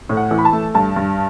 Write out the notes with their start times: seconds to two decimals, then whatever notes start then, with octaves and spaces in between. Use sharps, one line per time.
0.09 A2
0.17 F#5
0.31 E3
0.38 B5
0.45 A5
0.53 A3
0.75 G2 A5
0.96 G2